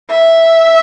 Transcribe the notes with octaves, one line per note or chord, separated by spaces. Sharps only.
E5